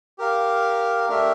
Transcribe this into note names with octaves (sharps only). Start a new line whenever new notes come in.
G4 A#4 F5
A3 D4 G4 A#4 E5